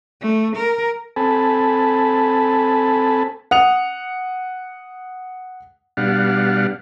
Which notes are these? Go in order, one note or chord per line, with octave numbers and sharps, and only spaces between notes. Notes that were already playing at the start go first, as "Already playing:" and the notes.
A3
A#4
C4 A4 G#5 A5 B5
F#5 D#6 F7
B2 G3 D4 F5 F#5